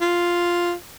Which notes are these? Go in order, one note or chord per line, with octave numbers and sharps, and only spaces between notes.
F4